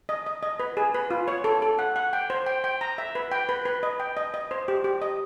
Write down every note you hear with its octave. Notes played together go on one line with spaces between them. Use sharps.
D#5
D#5
D#5
B4
G#4
B4
F4
C#5
A4
A4
F#5
F#5
G5
C5
G5
G5
A#5
E5
B4
G5
B4
B4
D#5
G5
D#5
D#5
C5
G4
G4
D#5